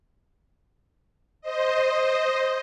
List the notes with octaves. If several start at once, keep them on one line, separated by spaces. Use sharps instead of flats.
C5 D#5